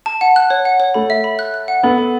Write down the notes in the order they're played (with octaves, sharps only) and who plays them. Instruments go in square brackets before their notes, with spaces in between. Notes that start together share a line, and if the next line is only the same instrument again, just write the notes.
[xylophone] A5
F#5
F#6
C#5
F#5
C#5
[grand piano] A3 [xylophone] B5
[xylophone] E5
B5
F#6
F#6
F#5
[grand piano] B3 [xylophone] A4
[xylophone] A4